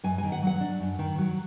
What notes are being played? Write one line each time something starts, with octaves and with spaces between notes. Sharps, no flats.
F#2 G#5
G#5
D#3
F#5
F#3 F#5
D4
F#2
D#3
F#3